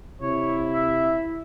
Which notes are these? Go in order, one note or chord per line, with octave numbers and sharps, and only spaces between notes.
C3 E4 C#5
E5